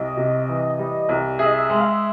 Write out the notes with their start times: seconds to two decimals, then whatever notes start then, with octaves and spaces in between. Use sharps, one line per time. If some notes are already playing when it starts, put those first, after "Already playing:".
Already playing: C2 D#5
0.17 C3
0.48 E3
0.79 G3
1.09 C2
1.39 G#4 E5
1.46 D#5
1.54 E5
1.70 G#3
1.80 F5
1.85 E5